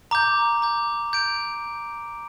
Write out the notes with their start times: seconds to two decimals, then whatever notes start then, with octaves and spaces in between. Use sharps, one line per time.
0.11 A#5 D6 G6
0.62 A#5 D6 G6
1.13 G6 D7 F7